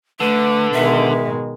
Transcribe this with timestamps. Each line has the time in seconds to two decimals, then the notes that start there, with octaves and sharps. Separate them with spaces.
0.20 D3 A3 B4
0.73 B2 D#3 G#3 E5